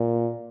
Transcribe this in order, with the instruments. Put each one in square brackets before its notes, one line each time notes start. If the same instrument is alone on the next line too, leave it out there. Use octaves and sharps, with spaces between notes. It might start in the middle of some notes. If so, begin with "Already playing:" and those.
Already playing: [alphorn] A#2